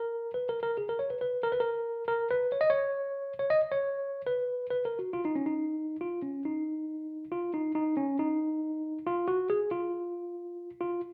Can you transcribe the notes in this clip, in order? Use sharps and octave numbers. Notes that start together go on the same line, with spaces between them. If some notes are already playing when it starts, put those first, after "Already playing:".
Already playing: A#4
B4
A#4
A#4
G#4
A#4
C#5
B4
B4
A#4
B4
A#4
A#4
B4
C#5
D#5
C#5
C#5
D#5
C#5
B4
B4
A#4
F#4
F4
D#4
C#4
D#4
F4
C#4
D#4
F4
D#4
D#4
C#4
D#4
F4
F#4
G#4
F4
F4